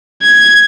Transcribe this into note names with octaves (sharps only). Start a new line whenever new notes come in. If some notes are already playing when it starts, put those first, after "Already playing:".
G#6